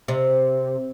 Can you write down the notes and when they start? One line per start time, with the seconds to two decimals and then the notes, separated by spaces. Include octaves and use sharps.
0.08 C3